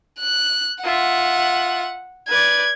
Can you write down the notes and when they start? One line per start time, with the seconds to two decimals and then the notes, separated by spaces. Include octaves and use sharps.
0.20 F#6
0.84 F4 E5 F#5
2.29 B4 D5 G#6